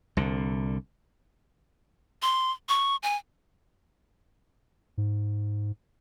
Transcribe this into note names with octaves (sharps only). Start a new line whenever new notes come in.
C2 D3
C6
C#6
G#5
G#2